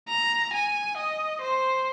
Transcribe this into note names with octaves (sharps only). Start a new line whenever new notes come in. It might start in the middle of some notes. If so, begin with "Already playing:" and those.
A#5
G#5
D#5
C5